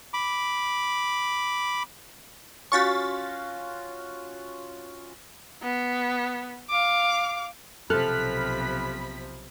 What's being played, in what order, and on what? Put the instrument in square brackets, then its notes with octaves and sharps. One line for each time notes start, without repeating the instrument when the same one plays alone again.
[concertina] B5 D6
[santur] C#4 F4 F#4 [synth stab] C#6 A6 B6
[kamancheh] B3
F5 D6
[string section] B1 B5 B6 [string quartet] C3 F3 [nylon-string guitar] A4 [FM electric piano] F6 F#6